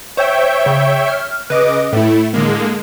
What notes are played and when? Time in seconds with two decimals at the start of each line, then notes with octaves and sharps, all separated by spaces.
0.17 C5 C#5 E5 G5
0.66 C#3
1.08 F6
1.50 C#3 B4 D#5 D6
1.93 A2 A3 E4
2.34 D3 G#3 A#3